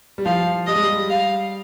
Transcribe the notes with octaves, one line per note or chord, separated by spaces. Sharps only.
G3
F3 F5
G3 D#5
G#3
G3
F5